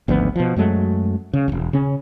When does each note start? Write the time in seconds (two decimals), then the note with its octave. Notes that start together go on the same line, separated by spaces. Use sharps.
0.08 G#1 D2 F3 B3
0.36 B2 F3
0.56 F#2 F#3 G#3 A3
1.33 C#3
1.48 E1 C#2
1.73 C#3 C#4